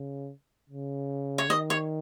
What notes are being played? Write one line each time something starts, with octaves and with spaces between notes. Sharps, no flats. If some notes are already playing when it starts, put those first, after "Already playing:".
Already playing: C#3
C#3
C#5
D#3 D#5
C#5